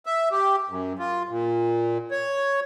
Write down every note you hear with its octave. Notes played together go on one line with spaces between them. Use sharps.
E5
G4
F#2
F4
A#2
C#5